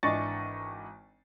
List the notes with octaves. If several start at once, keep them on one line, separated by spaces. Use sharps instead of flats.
G#1 E3 D4 D#5 C#6 A6